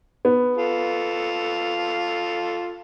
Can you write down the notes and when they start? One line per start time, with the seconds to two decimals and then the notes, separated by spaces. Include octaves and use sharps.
0.25 B3
0.57 F4 A4